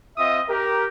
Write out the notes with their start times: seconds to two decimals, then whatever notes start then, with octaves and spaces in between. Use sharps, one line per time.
0.18 C4 F4 D#5 E5 D#6
0.49 G4 A#4